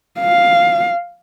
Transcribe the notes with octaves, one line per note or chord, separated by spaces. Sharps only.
F5